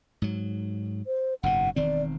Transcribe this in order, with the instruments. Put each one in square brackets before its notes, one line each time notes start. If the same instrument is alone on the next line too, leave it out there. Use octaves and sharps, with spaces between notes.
[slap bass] G#2 F#3
[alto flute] C5
[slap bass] F#1 G#2 B2 [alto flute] F#5
[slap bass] E1 D#3 C4 [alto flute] D5